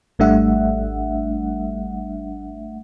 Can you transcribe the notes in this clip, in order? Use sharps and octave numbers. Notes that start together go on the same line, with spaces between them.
G#1 G3 A3 D4 E5 F#5